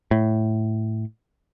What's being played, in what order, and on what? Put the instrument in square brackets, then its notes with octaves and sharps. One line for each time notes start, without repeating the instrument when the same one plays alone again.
[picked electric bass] A2